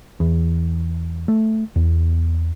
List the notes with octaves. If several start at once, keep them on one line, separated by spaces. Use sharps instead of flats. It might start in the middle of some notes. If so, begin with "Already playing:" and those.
E2
A3
E2